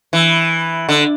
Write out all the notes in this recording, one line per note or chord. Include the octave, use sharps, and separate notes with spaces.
E3
D3